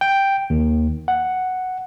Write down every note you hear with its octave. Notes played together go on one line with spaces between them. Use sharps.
G5
D#2
F#5